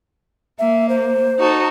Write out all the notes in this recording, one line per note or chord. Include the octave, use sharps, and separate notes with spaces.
A#3 E5
C5
D#4 F#4 A4